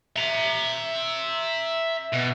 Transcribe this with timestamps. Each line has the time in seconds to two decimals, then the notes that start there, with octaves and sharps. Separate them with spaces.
0.16 E5 A#5
2.13 B2